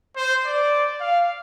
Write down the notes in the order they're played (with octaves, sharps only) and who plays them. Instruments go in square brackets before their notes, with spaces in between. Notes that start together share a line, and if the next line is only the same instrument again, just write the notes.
[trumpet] C5
D5
F5